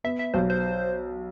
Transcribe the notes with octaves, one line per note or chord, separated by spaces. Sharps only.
B3 E5
E5
B1 C5
C5